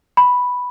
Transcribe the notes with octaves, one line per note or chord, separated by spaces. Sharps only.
B5